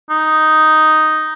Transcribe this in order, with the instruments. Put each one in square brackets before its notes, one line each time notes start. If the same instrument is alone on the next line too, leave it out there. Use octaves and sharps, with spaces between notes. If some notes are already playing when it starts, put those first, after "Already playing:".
[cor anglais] D#4